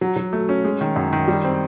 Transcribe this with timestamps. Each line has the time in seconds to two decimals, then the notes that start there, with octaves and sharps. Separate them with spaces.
0.01 F#3
0.16 F#3
0.33 A3
0.49 C#4
0.64 G#3
0.81 D#3
0.96 F#2
1.13 D#3
1.28 G3
1.44 C4